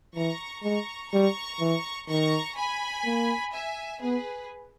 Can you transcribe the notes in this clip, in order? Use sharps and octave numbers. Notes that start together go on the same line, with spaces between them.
E3 A#5 C#6
G#3 A#5 C#6
G3 A#5 C#6
E3
D#3 A#5 C#6
G#5 B5
A#3
E5 G#5
B3 G#4 B4